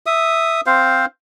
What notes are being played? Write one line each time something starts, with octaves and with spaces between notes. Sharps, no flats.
E5 D#6
C4 C5 F5